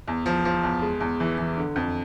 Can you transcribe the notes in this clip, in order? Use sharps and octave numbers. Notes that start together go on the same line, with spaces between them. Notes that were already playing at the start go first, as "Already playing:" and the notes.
E2
F3
F3
E2
G#3
E2
E3
E3
D3
F2